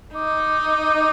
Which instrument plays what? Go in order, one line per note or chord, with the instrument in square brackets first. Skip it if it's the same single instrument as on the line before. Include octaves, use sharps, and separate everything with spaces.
[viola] D#4 [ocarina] D6